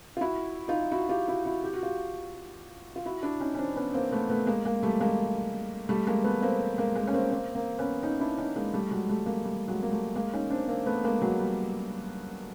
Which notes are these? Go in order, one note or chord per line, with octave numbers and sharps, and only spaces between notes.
F4
E4 F#4
D#4 F4
E4 F#4
F4 G4
E4 F#4
E4 F#4
G4
F#4
F4 G4
F4
E4 F#4
D4 E4
C#4 D#4
C#4
C4 D4
B3 C#4
A#3 C4
A3 B3
A3 B3
G#3 A#3
G#3 A#3
G3 A3
G#3 A#3
G3 A3
G#3 A#3
A3 B3
A#3 C4
G#3 A#3
G#3 A#3
C#4
A#3 C4
A#3 C4
A#3 C4
B3 C#4
C#4 D#4
D4 E4
C#4 D#4
G#3 A#3
G3 A3
F#3 G#3
G3 A3
G#3 A#3
G3
F#3 G#3
A#3
G3 A3
G#3 A#3
C#4 D#4
C4 D4
A#3 C4
A3 B3
G#3 A#3
F#3 G#3
G3